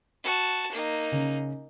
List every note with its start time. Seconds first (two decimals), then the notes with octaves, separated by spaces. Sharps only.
0.24 F#4 A5
0.72 A#3 D#4
1.12 C#3